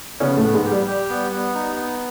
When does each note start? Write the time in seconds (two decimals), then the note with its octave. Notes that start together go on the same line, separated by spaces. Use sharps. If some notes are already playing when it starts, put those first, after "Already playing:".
0.20 C#3 B3 C#4
0.37 A2 A3
0.43 B3
0.54 G#2 G#3
0.65 G4
0.72 G3
0.87 G4
1.10 B3
1.32 B3
1.55 D#4
1.76 B3